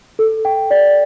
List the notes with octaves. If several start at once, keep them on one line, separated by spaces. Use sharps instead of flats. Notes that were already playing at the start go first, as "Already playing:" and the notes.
A4
G5
D5